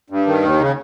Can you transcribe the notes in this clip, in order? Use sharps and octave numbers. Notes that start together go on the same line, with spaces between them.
G2
D#3
D#2
C#3